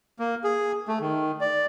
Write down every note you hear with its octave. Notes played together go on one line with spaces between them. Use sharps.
A#3
G#4
A3
D#3
D5